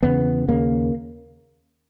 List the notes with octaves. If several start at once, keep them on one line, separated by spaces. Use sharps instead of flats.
E2 C#3 B3
D#2 C#3 A#3